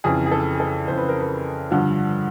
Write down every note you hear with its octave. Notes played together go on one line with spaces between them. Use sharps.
F2 C#3 E3 G#4
G#4
A4
G#4
A4
F2 C#3 E3 C5
B4
A#4
B4
G2 D3 F3